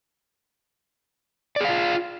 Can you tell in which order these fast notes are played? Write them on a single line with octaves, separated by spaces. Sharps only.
D5 G#4 F5 F4